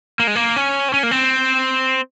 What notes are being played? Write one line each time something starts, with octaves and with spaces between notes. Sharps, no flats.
A#3
G#3
A#3
C#4
C4
C#4
A#3
C4